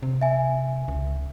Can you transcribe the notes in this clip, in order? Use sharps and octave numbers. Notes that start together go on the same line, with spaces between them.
C3
E5 G#5
C#2